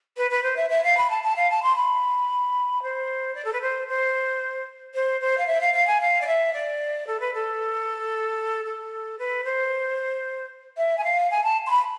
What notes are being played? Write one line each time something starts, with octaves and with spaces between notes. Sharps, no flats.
B4
B4
C5
E5
E5
F5
B5
A5
A5
F5
A5
C6
B5
C5
D5
A4
B4
C5
C5
C5
C5
F5
E5
F5
F5
G#5
F5
D5
E5
D5
A4
B4
A4
A4
B4
C5
E5
G#5
F5
G#5
A5
C6
B5